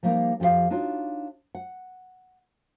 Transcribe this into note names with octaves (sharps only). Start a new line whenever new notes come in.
F3 G3 A#3 D#4 A#4 F5
F2 F3 F#4 G4 F5
D4 D#4 F4 F#4 C#5
F#5